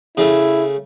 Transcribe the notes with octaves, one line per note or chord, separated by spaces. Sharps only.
C#3 A3 E4